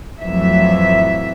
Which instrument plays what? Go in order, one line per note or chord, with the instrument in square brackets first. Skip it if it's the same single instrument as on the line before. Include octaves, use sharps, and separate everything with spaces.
[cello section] F2 A2 E3 F#3 E5